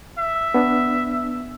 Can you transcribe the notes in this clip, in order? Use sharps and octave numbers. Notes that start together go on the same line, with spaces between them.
E5
B3 D4